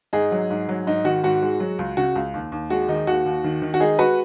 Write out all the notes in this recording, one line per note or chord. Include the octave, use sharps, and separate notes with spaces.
G#2 D#4 G#4
F#3
G#2
F#3
G#2 D#4
D#3 F#4
G#2 F#4
G#3
F#3
C#2
C#3 F#4
C#2
D#2
D#2
G#3 F#4
D#3 D#4
D#2 F#4
D#2
D#3
D#3
F#4
G#3 D#4 G#4
G#3 F#4 B4